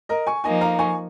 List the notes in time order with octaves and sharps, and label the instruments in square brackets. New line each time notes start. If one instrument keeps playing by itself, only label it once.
[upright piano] A#4 D#5
G#5 C#6
[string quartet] F3 A#3 D#4 [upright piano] D#5 G#5
[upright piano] F5 A#5
G#5 C#6